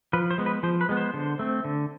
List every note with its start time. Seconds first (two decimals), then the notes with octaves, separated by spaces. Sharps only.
0.13 F3 B4
0.31 C5
0.38 G#3 B3
0.46 B4
0.63 F3 C5
0.81 B4
0.89 G#3 B3
0.97 C5
1.14 D3
1.39 A3 C4
1.65 D3